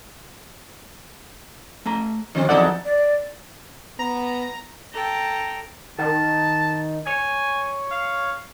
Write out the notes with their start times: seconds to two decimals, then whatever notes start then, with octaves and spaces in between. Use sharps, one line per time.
1.86 A3 G#5 A#5
2.35 B2 D3 D#3 F3 C4
2.49 E2 F3 F#3 C4 D#4 A4 D5 F#5
2.85 D5
3.99 B3 A#5
4.92 A4 G5 A#5
5.98 D#3 A5
7.06 C#5 G#5
7.91 F5